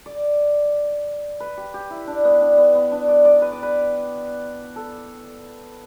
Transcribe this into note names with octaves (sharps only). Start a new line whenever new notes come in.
D5
B4
G4
G4
E4
D4
B3
D4
B3
B3
D4
D5
D5
B4
D5
B4
A4